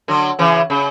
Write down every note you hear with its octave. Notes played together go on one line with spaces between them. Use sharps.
D3 F#3
C#3 E3
C#3